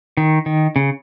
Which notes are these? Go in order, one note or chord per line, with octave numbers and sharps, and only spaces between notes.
D#3
D#3
C#3